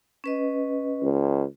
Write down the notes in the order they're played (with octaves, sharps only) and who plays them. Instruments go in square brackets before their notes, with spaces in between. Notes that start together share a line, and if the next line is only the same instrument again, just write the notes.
[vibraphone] C#4 B4 D#5
[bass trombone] C#2